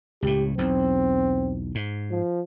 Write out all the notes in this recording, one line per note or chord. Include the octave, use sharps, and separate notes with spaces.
C#2 A2 G4
B1 E2 C4
G#2
F3